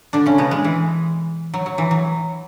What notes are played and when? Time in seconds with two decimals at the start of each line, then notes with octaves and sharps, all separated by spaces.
0.13 D3 D4
0.26 C#3 C#4
0.38 B2 B3
0.51 G#3
0.64 E3
1.54 F#3
1.66 F#3
1.78 E3
1.91 F#3